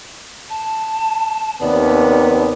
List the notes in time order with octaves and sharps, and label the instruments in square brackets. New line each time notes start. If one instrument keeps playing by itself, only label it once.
[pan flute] A5
[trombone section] D#2 C3 B3 [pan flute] D5